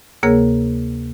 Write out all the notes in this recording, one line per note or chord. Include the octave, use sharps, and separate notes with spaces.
D2 C3 A#3 G#4 A#4 C#5